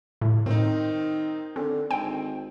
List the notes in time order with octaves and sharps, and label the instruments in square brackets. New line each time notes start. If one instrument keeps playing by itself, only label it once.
[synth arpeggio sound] A2
[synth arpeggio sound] A2 [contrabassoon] D#3 [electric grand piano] C4 D#4
[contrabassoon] D3 [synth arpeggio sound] C4
[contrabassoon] G#1 [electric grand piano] C4 [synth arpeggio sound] G5